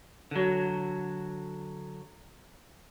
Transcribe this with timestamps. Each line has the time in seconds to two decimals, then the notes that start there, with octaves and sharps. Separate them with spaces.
0.31 D3 F#3